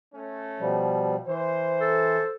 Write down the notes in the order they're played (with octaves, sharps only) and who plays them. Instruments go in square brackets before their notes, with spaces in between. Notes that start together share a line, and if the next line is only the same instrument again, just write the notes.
[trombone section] A3 C#4
[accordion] B2 F3 G3
[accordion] E3 [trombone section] C5
[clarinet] A4